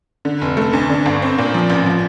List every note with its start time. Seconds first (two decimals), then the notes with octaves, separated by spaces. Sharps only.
0.25 D3
0.42 F1
0.57 A3
0.73 D2
0.90 D3
1.06 G1
1.22 C4
1.38 A#2
1.54 F3
1.70 A1
1.86 F3